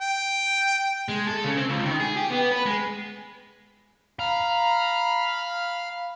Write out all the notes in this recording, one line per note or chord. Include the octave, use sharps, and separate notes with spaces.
G5
G#3
A4
C#3
C4
C#2
D#3
G#4
G4
B3
B4
G#3
F5 A#5 B5 F6